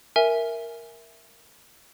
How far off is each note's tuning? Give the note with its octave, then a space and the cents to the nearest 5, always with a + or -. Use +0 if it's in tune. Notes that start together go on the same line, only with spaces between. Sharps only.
A#4 +0 E5 +0 G#5 +0